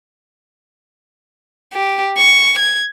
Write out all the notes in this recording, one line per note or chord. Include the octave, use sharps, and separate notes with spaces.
G4
C#6
G#6